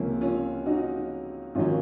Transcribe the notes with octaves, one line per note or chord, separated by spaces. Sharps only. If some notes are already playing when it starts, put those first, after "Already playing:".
Already playing: C#2 C3 F3 A#3 C#4
C#4 F4
D#4 F#4
G#1 D#3 F#3 C#4 F4